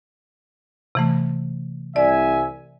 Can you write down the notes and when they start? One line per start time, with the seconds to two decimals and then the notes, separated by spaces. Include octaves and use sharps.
0.95 C3 E3 A3
1.96 C2 D5 E5 G#5